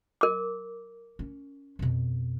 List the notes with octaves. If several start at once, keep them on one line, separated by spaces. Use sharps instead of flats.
A#4 D6
C#4
F2 B2